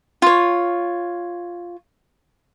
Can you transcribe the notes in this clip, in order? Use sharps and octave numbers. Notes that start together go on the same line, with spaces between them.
F4 C#5